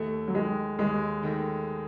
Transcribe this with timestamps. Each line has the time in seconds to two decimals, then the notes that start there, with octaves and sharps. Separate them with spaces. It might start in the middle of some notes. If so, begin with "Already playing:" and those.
Already playing: D#2 A3
0.28 F#3
0.34 D#3 G#3 A3
0.79 D#2 G#3
1.23 D#3 A3